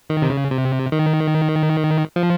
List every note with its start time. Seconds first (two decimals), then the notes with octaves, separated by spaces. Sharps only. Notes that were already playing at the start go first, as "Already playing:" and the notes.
0.10 D#3
0.22 C3
0.30 C#3
0.51 C3
0.92 D#3
2.16 F3